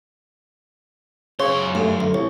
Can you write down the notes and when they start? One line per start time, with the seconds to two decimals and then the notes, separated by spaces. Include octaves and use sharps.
1.40 F#2 C#3 C#5 C6
1.75 G2 A3
2.00 D2
2.14 C2 C#5